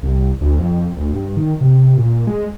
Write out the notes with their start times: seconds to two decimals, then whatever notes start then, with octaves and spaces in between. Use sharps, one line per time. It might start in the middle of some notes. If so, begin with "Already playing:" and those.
0.03 C2
0.41 D2
0.59 F2
0.97 D2
1.13 G2
1.37 D#3
1.61 C3
1.97 A#2
2.27 G#3